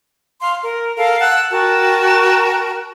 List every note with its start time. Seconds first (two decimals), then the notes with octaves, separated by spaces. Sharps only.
0.41 F5 C6
0.63 A#4
0.96 A4 A#4 F5
1.20 F#5 A5 E6 F#6
1.51 F#4 A#4 G5 A5